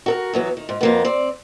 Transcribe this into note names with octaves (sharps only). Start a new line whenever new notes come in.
F#4 A4 A#4
E2 F#3 B3
D#3
G#2
F2 A#3 B3
C4 D5